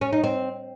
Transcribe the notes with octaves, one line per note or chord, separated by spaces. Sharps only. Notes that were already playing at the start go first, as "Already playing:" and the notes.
C#4
D#4
C4